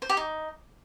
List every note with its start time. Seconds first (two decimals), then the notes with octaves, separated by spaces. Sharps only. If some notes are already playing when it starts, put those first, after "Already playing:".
0.02 C5
0.09 G4
0.17 D#4